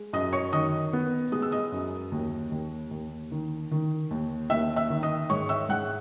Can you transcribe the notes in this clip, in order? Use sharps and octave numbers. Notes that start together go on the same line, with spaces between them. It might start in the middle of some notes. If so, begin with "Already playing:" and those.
Already playing: G#3
F#2 D#5 D#6
C#5 C#6
D#3 D#5 D#6
B3
G#3 D#6
E6
D#5 D#6
F#2
D#2
D#2
D#2
D#3
D#3
D#2
D#2 E5 E6
E5 E6
D#3
D#5 D#6
G#2 C#5 C#6
E5 E6
G#2 F#5 F#6